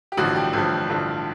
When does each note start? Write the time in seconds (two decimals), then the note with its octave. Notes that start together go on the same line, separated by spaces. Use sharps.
0.12 G4
0.17 A1 G2 D3 F3 F#4
0.35 G4
0.53 A1 G2 D3 F3
0.90 A1 G2 D3 F3